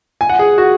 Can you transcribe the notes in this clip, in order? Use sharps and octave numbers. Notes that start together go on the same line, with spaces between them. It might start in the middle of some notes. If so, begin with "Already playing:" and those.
G#5
F#5
G#4
F#4